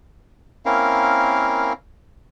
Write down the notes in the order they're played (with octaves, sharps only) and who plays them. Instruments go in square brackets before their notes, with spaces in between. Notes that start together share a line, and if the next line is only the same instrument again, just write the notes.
[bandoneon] A#3 C4 C#4 E4 A#4 F5